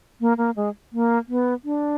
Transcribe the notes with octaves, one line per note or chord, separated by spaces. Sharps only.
A#3
A#3
G#3
A#3
B3
D4